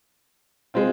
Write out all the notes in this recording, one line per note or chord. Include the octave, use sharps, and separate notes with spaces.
G#3 C4 F4